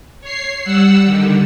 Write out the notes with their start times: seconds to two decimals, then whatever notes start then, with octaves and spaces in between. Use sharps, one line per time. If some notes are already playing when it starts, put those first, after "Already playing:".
0.21 C#5 C7
0.64 G3 F#5 E6
1.03 D3 D#3 G3